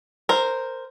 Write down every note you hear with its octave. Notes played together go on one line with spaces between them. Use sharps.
A#4 C5